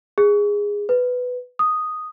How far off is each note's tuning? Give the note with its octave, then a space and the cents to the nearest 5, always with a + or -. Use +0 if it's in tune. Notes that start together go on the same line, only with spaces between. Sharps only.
G#4 -15
B4 +10
D#6 -5